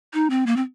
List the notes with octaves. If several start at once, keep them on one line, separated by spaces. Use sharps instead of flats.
D#4
C4
A#3
C4